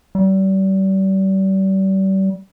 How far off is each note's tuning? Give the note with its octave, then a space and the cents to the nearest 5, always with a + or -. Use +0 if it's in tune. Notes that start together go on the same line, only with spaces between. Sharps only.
G3 -35